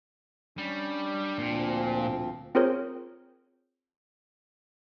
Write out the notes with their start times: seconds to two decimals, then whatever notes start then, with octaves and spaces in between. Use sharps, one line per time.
0.58 G3 C#4 D4
1.38 D2 A#2 F3 C4
2.55 C4 F4 G#4 A#4 C5 C#5